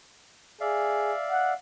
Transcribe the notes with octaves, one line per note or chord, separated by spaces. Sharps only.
G#4 D5 E5 F5
F#5